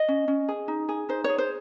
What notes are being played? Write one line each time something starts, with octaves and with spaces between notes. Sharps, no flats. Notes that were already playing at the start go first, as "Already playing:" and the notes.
Already playing: D#5
C#4
C#4
G#4
D#4
G#4
D#4 C5
G#4 C#5
C5